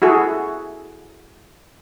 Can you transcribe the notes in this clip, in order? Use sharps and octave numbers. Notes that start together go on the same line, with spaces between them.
E4 F#4 G#4 A4